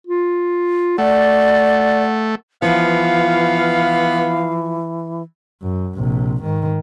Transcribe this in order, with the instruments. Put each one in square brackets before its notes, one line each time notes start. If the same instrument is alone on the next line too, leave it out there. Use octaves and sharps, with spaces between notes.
[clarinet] F4
[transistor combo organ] A3 [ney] D5 [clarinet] F#5
[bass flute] E3 [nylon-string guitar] F3 F4 [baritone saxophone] B3 [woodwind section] F5
[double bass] F#2
A#1 C3
G#2 D#3